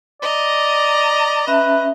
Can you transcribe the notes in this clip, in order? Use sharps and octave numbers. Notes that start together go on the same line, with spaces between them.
D5 D#5 A#5
C#4 B4 E5